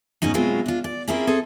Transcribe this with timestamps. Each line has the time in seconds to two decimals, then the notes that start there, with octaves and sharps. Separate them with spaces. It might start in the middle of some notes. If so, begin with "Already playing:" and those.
0.22 G#2 B2 C#4 D#4 F#4
0.34 B2 F#3 G#3 C4 E4 F4
0.66 D4 F4
0.84 D5
1.08 A#3 C4 C#4 E4 F4 G#4
1.27 C4 G#4 A4